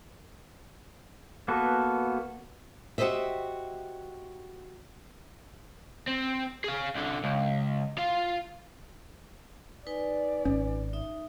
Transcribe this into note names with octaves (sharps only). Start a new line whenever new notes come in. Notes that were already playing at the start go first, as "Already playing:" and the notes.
A#3 B3 F#4 A4 B4
F#4 G4 A#4 C5 D#5 E5
C4
G#4 F5
C2 D3
C#2
F4 F5
D#4 B4 D5 G#5
G#1 C#4
D#4 E5 D#6